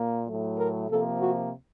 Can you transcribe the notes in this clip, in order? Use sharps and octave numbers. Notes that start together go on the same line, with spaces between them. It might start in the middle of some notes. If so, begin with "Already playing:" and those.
Already playing: A#2 A#3
A2 F#3 A3
A#4
C3 F3 A#3 A4
F#4